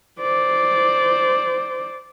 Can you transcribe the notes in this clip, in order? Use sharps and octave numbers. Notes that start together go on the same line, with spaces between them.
C5 D5